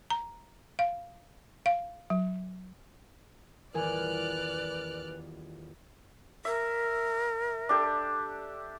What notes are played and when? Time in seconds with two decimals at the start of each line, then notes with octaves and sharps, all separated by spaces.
0.10 A#5
0.79 F5
1.66 F5
2.10 F#3
3.74 D#1 E2 A#4 B4 D5 G#5 F6 F#6
6.45 A#4 E5
7.69 D4 G4 A4